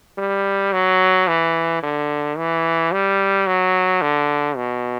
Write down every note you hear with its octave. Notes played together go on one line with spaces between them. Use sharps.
G3
F#3
E3
D3
E3
G3
F#3
D3
B2